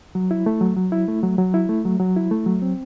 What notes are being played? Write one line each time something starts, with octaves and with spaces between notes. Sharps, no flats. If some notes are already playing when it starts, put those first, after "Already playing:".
F#3
E4
A3
F#3
F#3
E4
A3
F#3
F#3
E4
A3
F#3
F#3
E4
A3
F#3
C4